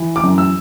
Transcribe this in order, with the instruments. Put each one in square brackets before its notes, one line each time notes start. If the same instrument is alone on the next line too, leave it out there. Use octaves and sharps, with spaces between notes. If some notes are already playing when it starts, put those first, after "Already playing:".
Already playing: [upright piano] E3
D6
F#2
E6